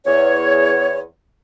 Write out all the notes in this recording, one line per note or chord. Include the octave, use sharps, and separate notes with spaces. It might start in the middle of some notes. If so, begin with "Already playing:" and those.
E2 C#5